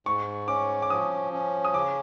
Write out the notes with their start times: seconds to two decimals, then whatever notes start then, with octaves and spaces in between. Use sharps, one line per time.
0.06 G#2 C#6
0.48 C#4 D6
0.82 D6
0.90 F3 D#6
1.33 C#4
1.65 D#6
1.74 C#3 D6